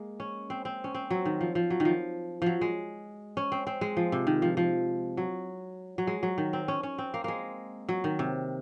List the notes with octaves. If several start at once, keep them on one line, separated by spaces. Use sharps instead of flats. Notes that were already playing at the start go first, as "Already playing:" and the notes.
Already playing: G#3 A#3
C#4
C4
C4
C#4
C4
F#3
D#3
F3
F3
F#3
D#3
F3
F3 F#3
G#3
C#4
C4
C4
G#3
F3
C3
D#3
F3
F3
F#3
F#3
G#3
F#3
D#3
C4
C#4
C#4
C4
A#3
G#3 A#3
F#3
D#3
C3